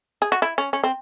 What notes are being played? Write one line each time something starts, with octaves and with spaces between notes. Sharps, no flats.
G#4
F#4
E4
C#4
C#4
C4